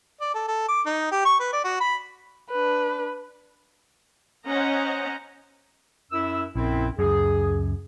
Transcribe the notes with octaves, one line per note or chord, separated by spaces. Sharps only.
D5
A4
A4
D6
D#4
G4
C#6
B4
D5
F#4
B5
D4 B4
C#4 C5 D#5 F#5 A#5
F#2 E4 E6
A#1 F#2 C4 E4
C#2 F#2 G#4